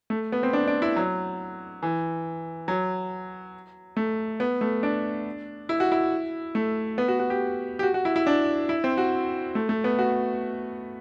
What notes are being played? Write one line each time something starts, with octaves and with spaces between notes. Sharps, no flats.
A3
B3
C4
D4
D4
E4
F#3
E3
F#3
A3
B3
A3
D4
E4
F#4
E4
A3
B3
F#4
F#4
G4
G4
F#4
F#4
E4
E4
D4
E4
C4
F#4
A3
A3
B3
F#4